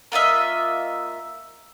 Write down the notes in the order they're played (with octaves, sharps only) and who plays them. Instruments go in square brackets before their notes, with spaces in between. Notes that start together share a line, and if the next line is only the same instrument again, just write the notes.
[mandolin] A#3 F4 D#5 E5